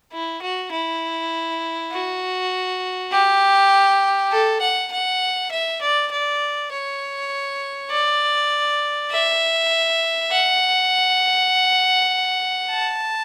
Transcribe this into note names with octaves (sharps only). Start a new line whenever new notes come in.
E4
F#4
E4
F#4
G4
A4
F#5
F#5
E5
D5
D5
C#5
D5
E5
F#5
A5